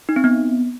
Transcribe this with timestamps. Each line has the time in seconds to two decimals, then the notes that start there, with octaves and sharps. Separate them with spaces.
0.09 D#4
0.16 C4
0.24 B3